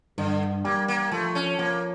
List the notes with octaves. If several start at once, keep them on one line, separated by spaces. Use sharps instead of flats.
G2 D3
G3 A#3
A#3
F3 A3
C#4
F3 A#3